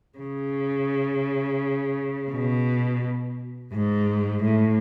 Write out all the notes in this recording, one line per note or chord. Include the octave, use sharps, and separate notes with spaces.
C#3
B2
G#2
A2